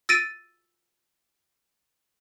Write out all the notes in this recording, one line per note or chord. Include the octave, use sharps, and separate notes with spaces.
E6 A6 A#6 D7 D#7